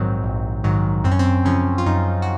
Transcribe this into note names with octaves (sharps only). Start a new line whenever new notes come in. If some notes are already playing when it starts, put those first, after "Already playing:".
Already playing: A#1 G#2 D#3 F#3 C4
A#1
G#2 D#3 F#3
F#2 C4
C#4
C4
C#3 F3 C#4
F4
F#2 D#4
F#4